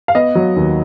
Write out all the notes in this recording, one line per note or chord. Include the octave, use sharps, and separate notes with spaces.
F5
B3 D#5
F#3
D#2